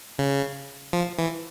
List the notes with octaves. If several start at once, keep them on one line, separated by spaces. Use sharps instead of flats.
C#3
F3
E3